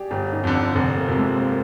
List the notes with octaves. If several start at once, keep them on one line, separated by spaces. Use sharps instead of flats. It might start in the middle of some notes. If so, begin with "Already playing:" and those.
Already playing: G4 G#4 D5
G1 G4
D#4
F2 D3
D4
F1 C4
A#3
F2 C3
G#3
C4
A#3